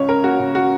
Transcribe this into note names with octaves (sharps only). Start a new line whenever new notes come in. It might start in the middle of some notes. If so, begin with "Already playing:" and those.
Already playing: C#2 C#3 C#5
C#4 A#4
A#3 F#4
C#3
F#4